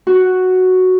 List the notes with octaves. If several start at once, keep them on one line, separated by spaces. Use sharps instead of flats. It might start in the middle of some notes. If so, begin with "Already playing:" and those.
F#4